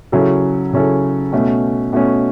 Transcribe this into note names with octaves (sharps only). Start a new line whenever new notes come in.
C#3 F#3 C#4 E4 A4
C#3 F#3 C#4 E4 A4
B2 A3 C#4
B2 A3 C#4